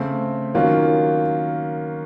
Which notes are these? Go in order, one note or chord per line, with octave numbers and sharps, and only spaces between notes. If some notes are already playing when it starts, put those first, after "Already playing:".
Already playing: C#3 A3 C4
D#3 F#3 A#3 C#4 F4